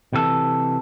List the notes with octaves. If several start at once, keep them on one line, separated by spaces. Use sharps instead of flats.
C3 E3 A4